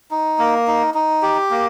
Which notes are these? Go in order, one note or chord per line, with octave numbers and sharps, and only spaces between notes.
D#4
A#3
D#4
D#4
G4
A#3